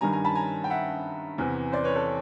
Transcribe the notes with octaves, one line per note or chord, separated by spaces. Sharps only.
G2 D#3 G3 G#5 A#5
G#5 A#5
A5 B5
G#5 A#5
G5
E5 F#5
E2 C3 E3
C5 D5
B4 C#5
A4 B4